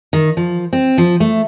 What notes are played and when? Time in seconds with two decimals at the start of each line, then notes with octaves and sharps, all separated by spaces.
0.13 D#3
0.37 F3
0.73 C4
0.98 F3
1.20 A3